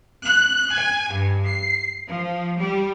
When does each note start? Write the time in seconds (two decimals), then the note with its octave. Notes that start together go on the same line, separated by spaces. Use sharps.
0.24 F#6
0.74 G#5
1.12 G2
1.46 C7
2.08 F3
2.57 G3